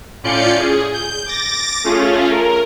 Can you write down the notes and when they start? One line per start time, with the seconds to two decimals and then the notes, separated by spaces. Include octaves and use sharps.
0.23 A2 C#4 F4 D5 G6 C#7
0.59 G#4
0.93 G6
1.26 D6 A6 A#6
1.84 A3 C#4 F4 G#4
2.30 A#4